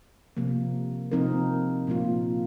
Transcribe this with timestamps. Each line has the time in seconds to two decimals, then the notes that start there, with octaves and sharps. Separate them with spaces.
0.37 C3 F3 A#3
1.12 C3 F3 C4 D#4 A#4
1.87 A#2 F3 A#3 F4